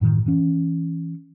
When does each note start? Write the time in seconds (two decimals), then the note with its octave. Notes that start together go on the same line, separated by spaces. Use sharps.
0.01 F#2 A2 D3 D#3
0.26 E3 C#4